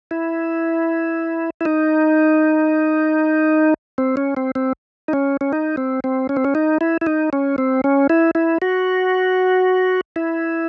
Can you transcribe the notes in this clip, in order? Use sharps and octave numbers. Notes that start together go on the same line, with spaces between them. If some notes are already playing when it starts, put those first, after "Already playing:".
E4
E4
D#4
C4
C#4
C4
C4
D#4
C#4
C#4
D#4
C4
C4
C#4
C4
C#4
D#4
E4
E4
D#4
C#4
C4
C#4
E4
E4
F#4
E4